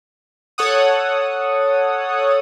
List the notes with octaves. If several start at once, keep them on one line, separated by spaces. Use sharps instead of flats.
A4 C#5 F#5 D#6